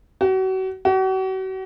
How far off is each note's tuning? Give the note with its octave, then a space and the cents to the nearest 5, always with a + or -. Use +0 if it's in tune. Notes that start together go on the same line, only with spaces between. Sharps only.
F#4 +35
F#4 +40